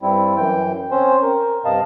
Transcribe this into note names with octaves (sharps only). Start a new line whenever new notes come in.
G2 G3 C4 E4
F#2 E3 G5
C4 C#4 C5
A#4
G2 C3 D#5 F5 A5